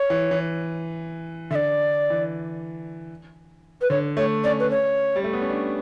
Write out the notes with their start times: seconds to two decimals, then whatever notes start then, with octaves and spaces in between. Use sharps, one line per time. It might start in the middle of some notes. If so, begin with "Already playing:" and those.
Already playing: C#5
0.10 E3
0.31 E3
1.51 D3 E5
1.55 D5
2.10 E3
3.81 B4
3.90 D3 C#5
4.17 A3 C#5
4.44 C#4 D5
4.60 B4
4.71 C#5
5.16 G3
5.24 A3
5.33 B3
5.42 C#4
5.50 D4